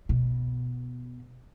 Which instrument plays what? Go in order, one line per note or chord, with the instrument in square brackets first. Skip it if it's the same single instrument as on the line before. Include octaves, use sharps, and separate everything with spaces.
[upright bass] B2